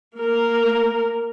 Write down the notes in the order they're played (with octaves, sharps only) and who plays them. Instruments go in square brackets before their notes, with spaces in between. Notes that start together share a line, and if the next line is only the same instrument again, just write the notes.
[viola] A#3 A#4